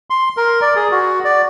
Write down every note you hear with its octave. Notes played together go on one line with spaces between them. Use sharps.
C6
A#4
D5
G#4
F#4
D5